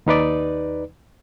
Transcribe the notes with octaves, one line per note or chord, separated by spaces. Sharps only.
D#2 D#4 B4 D5